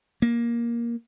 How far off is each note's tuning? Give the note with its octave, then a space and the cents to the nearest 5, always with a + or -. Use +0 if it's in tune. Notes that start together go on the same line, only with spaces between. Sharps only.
A#3 +10